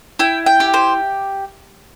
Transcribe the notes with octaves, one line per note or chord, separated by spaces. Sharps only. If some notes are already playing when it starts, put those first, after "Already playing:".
E4 G5
G5
G4
C5